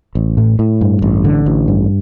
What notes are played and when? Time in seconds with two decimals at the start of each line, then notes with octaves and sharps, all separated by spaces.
0.15 A1
0.37 A2
0.59 A2
0.81 G2
1.02 A1
1.24 D3
1.46 A1
1.68 G2